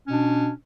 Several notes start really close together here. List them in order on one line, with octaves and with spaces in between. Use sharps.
C#4 B2 D4